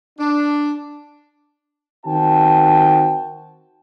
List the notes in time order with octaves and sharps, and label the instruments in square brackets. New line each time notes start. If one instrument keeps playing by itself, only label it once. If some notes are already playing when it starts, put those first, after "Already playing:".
[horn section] D4
[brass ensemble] D#3 C4 F#4 G5 A5